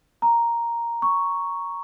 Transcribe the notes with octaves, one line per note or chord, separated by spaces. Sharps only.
A#5
C#6